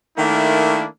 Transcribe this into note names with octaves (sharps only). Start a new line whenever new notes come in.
D#3 A3 A#3 D4 E4